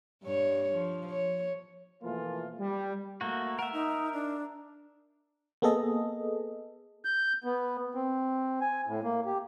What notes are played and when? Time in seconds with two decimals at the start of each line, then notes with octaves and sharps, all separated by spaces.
0.24 G2 C#5
0.74 F3
1.11 C#5
2.03 B2 E3 F3 A3 A#3 F4
2.60 G3
3.21 A3 A#3 F#4
3.59 A#4 E5 F#5
3.73 D#4
4.13 D4
5.62 A#3 B3 G#4 A4 D#5
7.05 G6
7.44 B3
7.95 C4
8.61 G#5
8.87 A2
9.04 A#3
9.26 G4